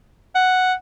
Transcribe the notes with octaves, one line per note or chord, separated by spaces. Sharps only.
F#5